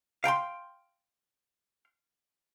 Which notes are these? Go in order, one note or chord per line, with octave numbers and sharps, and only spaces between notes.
F5 G5 A#5 C6